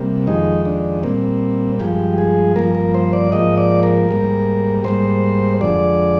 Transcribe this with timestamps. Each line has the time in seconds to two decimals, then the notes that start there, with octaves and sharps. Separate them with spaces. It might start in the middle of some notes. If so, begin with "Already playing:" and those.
Already playing: C3 G3 A#3
0.27 F2 D#3 G#3 D#4
0.65 D4
1.03 A#2 G3 A#3 C4
1.79 G2 F3 G#3 G4
2.18 G#4
2.56 G2 F3 A#3 A#4
2.75 A#4
2.94 C5
3.13 D5
3.32 G#2 F3 A#3 D#5
3.57 D5
3.83 A#4
4.09 G#2 G3 A#3
4.84 G#2 G3 A#3 C5
5.61 F2 D3 G#3 D5